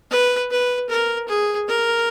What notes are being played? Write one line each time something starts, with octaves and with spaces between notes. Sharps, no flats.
B4
B4
A#4
G#4
A#4